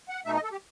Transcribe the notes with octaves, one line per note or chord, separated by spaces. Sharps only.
F#5
B2 A3 D#4 E5
D#5
A4
G4